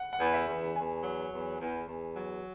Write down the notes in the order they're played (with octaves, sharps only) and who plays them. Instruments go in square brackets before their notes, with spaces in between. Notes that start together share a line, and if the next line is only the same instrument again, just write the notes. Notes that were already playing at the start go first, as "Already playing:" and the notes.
Already playing: [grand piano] F#5
F#5
[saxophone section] E2
[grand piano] E5
[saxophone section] E2
[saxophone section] E2 [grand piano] G#5
[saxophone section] F#3
E2
E2
E2
F#3